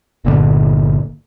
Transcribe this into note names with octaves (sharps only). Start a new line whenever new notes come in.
G1 A#2 D3